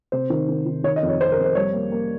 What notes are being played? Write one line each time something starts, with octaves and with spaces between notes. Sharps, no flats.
C3 C5
D#3
D#3
D#3
D#3 C#5
D#5
F2
C#5
F2 C5
A#4
F2
C5
G3 C#5
A#3
A#3